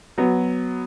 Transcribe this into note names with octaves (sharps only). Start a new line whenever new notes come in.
F#3 B3